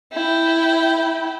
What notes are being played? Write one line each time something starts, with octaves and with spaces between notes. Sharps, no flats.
E4 G5